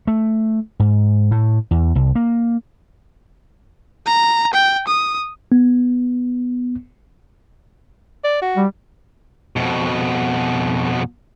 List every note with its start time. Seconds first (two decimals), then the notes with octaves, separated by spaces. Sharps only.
0.07 A3
0.80 G#2
1.31 A2
1.71 E2
1.95 C2
2.15 A#3
4.06 A#5
4.53 G5
4.88 D#6
5.52 B3
8.24 D5
8.42 F#4
8.57 G3
9.56 F2 B2